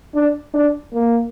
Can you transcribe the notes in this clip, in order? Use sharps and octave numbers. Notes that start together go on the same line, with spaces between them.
D4
D4
A#3